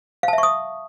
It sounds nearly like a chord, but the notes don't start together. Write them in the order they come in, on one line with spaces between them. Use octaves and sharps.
F5 A5 E5 C#6 D#6